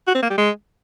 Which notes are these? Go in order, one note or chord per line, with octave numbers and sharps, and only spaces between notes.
F#4
C4
A#3
G3
G#3